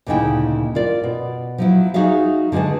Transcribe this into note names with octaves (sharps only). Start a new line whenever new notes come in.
D2 A#2 C#3 D#4 E4 G5
F4 A#4 D5
B2
F3 F#3 E4
D#4 F#4 G#4 E5 F5
D3 G#3 G#4 B4 A5